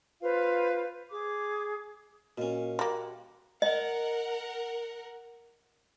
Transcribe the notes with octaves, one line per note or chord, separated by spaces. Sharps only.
F4 B4 C5 F5
G#4 D6
A#2 C#4 F#4 D#5
G3 A#3 F#5
A#4 D#5 F#5